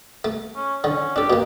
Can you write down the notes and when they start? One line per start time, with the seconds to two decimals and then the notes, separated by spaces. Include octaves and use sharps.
0.24 A3
0.56 C#4
0.84 D3 C#4
1.16 D4 G4 A4
1.30 B2 A#3